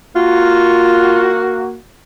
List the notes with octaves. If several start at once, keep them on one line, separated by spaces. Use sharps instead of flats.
A#3 F4 F#4